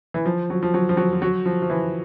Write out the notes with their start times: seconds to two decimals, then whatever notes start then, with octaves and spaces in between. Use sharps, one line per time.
0.14 E3
0.26 F3
0.50 F#3
0.63 F3
0.74 F#3
0.89 F3
0.97 F#3
1.13 F3
1.22 F#3
1.46 F3
1.62 F3
1.70 E3